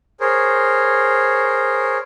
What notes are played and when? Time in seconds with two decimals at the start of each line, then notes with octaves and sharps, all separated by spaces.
0.20 G#4 A#4 C5 C#5